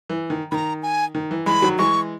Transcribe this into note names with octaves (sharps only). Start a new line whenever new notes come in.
E3
D#3
D#3 A#5 B5
G#5
D#3
E3
E3 G#3 B5
D#3 F#3
E3 G#3 C#6